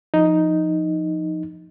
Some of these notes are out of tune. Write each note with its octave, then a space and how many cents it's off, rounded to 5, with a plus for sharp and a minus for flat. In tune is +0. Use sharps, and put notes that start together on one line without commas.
F3 +0 D#4 +0